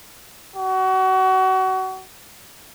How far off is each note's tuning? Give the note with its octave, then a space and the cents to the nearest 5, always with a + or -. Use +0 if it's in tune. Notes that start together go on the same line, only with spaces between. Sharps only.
F#4 +30